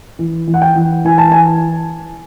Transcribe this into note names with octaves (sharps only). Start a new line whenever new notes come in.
E3
E3
F#5
G5
E3
E3 G#5
A5
G#5